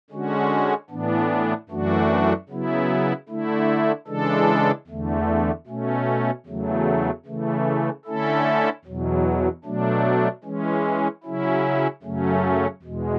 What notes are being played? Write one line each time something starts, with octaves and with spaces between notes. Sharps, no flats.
D3 G#3 C#4 F#4
A2 E3 B3 D4
F#2 E3 A3 D4 F#4
C#3 F#3 B3 E4
D3 A3 E4
C#3 E3 G#3 D4 A4
E2 D3 A3
B2 A3 C#4
E2 C#3 F#3 A3
C#3 E3 A3
D3 A3 C#4 E4 A4
E2 B2 F#3
B2 F#3 A3 D4
E3 G#3 C#4
C#3 F#3 C#4 E4
F#2 C#3 F#3 A3 C#4
E2 B2 G#3